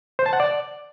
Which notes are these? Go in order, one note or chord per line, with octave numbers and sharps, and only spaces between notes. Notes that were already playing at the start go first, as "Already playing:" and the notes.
C5
A5
F#5
D5